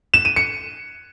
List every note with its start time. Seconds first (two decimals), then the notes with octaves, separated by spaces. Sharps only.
0.14 E7
0.25 D#7
0.36 C#7